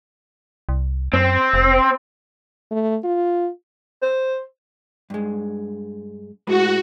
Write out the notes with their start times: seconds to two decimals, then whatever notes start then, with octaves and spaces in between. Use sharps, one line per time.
0.69 C2
1.13 F#2 C4
1.54 F1
2.71 A3
3.04 F4
4.02 C5
5.10 G2 G#3
6.47 A2 G#3 F#4 B4